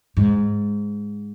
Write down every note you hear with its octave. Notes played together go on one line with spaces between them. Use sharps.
G#2